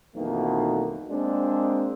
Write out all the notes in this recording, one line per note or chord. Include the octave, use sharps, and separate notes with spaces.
B1 F2 B2 D#3 E3 A#3
G#3 A#3 C4 D4